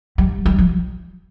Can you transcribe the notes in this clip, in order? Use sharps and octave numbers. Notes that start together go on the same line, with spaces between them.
G3
G3
F3